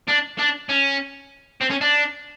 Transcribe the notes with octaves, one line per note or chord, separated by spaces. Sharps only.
D4
D4
C#4
C4
C#4
D4